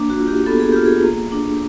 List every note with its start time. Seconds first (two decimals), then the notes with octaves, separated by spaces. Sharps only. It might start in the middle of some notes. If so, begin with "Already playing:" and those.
Already playing: A#3 D4
0.10 F#4
0.19 F4
0.28 G4
0.46 B3 A4
0.60 G#4
0.72 F4 G4
0.86 G#4
1.04 A#3
1.32 D4